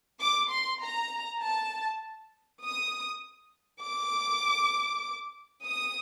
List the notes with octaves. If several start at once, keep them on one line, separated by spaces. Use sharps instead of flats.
D6
C6
A#5
A5
D#6
D6
D#6